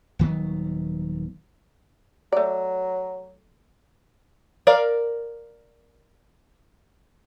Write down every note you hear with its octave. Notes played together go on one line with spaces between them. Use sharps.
D#1 D#3 F#3 B3
F#3 A3 D5
A#4 D5 F5